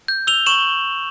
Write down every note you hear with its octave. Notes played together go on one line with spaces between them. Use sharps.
G6
E6 F7 G7
C#6 E7 F#7